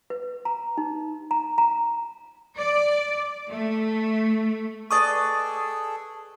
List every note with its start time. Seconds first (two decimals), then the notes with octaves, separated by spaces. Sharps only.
0.10 B4
0.45 A#5
0.78 D#4
1.31 A#5
1.58 A#5
2.57 D5
3.50 A3
4.91 G#4 A4 B4 D5 D#5 C#6 D#6